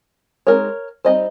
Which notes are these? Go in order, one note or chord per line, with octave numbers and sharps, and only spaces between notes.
G#3 C4 D#4 A#4 C#5
G3 C4 D#4 C5 D#5